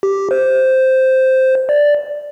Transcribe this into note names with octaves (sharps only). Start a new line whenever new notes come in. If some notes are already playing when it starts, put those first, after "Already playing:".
G4
C5
D5